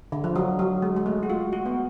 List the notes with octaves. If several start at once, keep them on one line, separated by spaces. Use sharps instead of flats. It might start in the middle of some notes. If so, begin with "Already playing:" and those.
D3
F3
F#3
F#3
G#3
G#3
A3
F#4
F4
F#4
B3